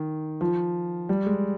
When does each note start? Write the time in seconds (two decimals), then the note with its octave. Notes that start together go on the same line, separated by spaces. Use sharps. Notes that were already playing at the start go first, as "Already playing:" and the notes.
Already playing: D#3
0.41 F3
1.09 G3
1.26 G#3